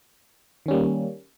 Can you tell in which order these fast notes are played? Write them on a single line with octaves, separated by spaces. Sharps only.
D#3 C#4 G3 A#3